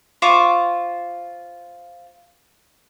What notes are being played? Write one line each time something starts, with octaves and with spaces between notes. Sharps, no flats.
F4 C5 C#6 D6